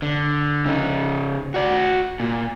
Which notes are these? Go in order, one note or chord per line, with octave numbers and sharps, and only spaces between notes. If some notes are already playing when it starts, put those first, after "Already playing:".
D3
C#3 D#4
F#4 D5
A#2